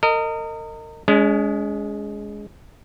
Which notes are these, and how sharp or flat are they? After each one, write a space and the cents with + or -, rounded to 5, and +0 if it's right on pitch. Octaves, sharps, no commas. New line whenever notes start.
A#4 -35 D#5 -5
G#3 +0 C#4 +45